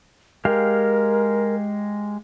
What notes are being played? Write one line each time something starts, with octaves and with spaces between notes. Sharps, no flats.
G#3 G4 A#4 F5